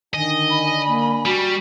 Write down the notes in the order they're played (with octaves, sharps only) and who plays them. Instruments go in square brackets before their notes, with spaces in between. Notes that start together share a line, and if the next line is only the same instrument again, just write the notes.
[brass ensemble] D3 D4 G#5 [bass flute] D#3 [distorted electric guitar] D#5
[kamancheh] B5
[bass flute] A#3
[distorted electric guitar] G3 [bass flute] F#4